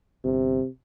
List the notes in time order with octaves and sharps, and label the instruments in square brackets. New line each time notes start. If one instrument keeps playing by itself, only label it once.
[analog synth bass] G1 [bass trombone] C3